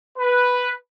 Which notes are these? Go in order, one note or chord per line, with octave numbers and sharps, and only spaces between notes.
B4